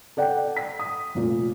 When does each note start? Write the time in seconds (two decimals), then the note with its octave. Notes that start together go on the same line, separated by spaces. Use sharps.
0.17 A4 D5 F#5 G5
0.57 B6
0.79 D#6
1.15 F1 A#2